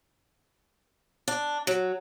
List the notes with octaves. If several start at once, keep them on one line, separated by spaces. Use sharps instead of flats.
D4
F#3